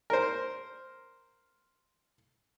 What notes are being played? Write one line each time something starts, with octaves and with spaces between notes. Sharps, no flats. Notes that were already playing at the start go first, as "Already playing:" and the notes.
A#4 C5